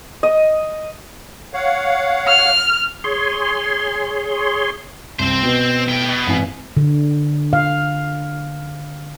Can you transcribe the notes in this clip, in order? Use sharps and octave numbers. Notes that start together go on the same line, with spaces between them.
D#5
C#5 F5 F#5
F6
G#4 C#5 C6
C2 C4 C5
B2
A2 G5
B2
G#1 E3 G#5
D3
F5